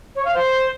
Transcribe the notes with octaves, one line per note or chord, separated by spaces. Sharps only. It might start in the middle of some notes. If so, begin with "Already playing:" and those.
C#5
F5
C5